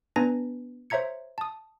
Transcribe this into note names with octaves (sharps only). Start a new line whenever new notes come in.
B3 D4 B4 G#5 A#5 A#6
C5 C#5 E5 A#5 G#6 C#7
A5 D#6